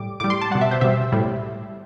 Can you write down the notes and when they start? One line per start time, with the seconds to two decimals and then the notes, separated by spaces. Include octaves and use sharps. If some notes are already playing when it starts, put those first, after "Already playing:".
Already playing: A2 G3 D6
0.20 A2 G3 D6
0.30 C6
0.42 A5
0.51 B2 G3 F#5
0.61 E5
0.71 C5
0.81 B2 G3 E5
1.12 A2 G3